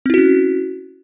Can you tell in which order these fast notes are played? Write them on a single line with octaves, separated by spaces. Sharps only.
C4 E4 F#4 C#4